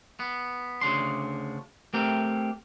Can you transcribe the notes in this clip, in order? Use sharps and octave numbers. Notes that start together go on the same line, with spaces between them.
B3
D2 C#3 D4 C6
A3 C4 G4 A#4 G5